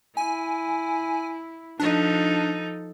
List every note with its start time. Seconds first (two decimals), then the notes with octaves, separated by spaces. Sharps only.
0.17 E4 G#5
1.80 F3 D4 D#4 A4